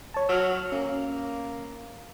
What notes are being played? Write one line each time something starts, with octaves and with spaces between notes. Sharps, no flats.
C#5 A5
F#3 E6 F6
A#3 C#4